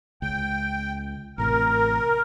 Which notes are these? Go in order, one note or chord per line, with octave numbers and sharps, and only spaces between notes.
C#2 G5
A1 A2 C3 A#4